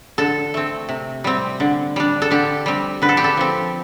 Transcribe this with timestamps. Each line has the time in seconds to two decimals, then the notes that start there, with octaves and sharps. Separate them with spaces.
0.18 D3 A4
0.54 A3 C4
0.89 C3
1.24 G3 C4
1.60 D3
1.96 G3 D4
2.22 A4
2.31 D3 G4
2.66 G3 C4
3.02 D3 B4
3.09 A4
3.17 G4
3.24 A4
3.37 F3 C4